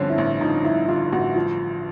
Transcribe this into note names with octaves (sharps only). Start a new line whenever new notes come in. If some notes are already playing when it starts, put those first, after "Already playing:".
Already playing: G2 D3 F3 C4 C#4
E4
A1
F3 D#4
G2 E4
D3 F4
A1 F#4
F3 F4